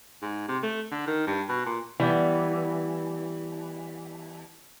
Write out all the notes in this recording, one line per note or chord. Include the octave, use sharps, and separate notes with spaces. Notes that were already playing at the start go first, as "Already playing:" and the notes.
G#2
C3
A3
D3
D#3
G2
B2
A#2
E3 G3 B3